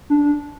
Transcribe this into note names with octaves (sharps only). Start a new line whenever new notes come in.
D4